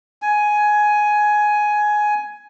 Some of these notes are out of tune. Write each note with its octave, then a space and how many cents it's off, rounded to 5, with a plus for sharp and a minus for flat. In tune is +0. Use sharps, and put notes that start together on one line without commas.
G#5 +10